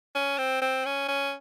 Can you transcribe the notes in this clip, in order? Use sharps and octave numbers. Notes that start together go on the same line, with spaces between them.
C#4
C4
C4
C#4
C#4